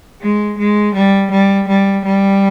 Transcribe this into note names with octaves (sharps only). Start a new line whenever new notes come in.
G#3
G#3
G3
G3
G3
G3